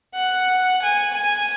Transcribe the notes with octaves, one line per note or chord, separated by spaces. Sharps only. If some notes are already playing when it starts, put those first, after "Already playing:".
F#5
G#5
G#5